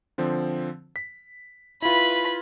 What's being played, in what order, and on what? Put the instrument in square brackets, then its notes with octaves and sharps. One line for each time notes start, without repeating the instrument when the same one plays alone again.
[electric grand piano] D3 F3 C4
B6
[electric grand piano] E4 F4 [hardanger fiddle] B4 B5